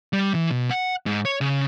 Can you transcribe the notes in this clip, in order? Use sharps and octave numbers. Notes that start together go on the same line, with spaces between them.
G3
E3
B2
F#5
G#2
C#5
C#3